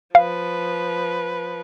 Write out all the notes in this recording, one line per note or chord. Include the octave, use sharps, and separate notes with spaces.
F3 B4 F5